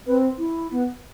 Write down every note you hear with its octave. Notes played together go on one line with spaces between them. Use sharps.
C4 B4
E4
B3